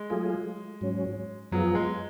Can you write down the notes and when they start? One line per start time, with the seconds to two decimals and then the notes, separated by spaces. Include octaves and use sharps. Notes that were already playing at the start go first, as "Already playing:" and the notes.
Already playing: G#3
0.10 F#3 A3 F4 G#4
0.81 G#2 F#3 C#4
1.51 F#2 F3 F#3 B3 F4 G#4
1.75 G#3